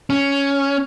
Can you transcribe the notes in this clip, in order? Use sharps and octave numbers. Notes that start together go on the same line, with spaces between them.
C#4